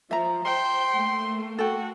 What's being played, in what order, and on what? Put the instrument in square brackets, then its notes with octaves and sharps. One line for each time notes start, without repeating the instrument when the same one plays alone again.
[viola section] F3 [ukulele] E5 A#5
[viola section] C5 [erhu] G5 [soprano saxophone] C6
[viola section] A3 A#3
[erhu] F#4 [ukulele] A4 G5